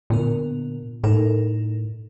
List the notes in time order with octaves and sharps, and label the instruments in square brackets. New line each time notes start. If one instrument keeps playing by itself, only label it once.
[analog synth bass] A#2 [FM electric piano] D3 B3 A#4
[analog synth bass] A2 [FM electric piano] D#4 A4 A#4